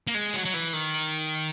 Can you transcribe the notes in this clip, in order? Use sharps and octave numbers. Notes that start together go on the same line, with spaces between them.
A#3
G#3
F#3
F#3
E3
D#3